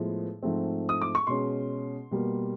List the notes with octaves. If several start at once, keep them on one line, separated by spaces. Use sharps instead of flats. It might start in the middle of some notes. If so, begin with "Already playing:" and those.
Already playing: A2 F3 G#3 B3
G#2 F3 A3 C4
D#6
D6
C#6
B2 G#3 C#4 C6
B2 G3 A#3